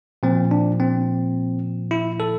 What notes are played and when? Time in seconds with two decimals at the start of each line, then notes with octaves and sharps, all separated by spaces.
0.23 A#2 F3 C4
0.51 D4
0.80 C4
1.91 E4
2.20 A4